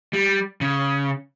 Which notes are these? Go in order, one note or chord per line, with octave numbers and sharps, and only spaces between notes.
G3
C#3